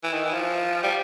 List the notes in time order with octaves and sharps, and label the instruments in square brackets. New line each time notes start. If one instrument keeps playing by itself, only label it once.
[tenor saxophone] E3
D#3
E3
F3
G3